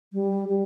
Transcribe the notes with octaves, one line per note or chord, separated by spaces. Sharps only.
G3
G3